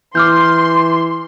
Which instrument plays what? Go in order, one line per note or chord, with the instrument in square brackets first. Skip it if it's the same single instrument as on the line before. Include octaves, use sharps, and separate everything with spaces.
[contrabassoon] E3 [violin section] C6 [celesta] D6 F6 G6